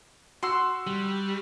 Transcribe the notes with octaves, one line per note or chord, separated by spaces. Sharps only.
F#4 F#5 C6 E6
G3